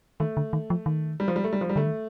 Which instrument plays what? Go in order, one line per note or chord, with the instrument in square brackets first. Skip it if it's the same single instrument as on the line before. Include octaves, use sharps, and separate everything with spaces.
[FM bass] D#3 [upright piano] A3
[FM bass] D3
D#3
F3
D#3
[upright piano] G3
F3
G3
A3
G3
F3
G3
[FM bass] D3 [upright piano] A3
[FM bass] D#3